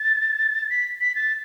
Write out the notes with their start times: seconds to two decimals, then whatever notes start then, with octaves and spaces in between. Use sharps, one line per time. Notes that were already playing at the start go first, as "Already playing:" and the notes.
Already playing: A6
0.70 B6
1.01 B6
1.15 A6